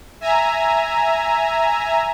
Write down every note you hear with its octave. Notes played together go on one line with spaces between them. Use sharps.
E5 G#5 A#5